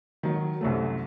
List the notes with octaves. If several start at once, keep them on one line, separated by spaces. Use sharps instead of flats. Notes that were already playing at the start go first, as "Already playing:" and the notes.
D#3 F#3
C2 F#2 A3